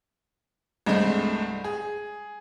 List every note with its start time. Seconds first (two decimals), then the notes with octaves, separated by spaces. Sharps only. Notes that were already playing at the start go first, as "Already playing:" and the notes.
0.86 C2 G2 G#3 A3 C4
1.64 G#4